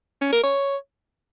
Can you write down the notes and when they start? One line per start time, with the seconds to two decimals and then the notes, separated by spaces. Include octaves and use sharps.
0.21 C#4
0.32 A#4
0.43 C#5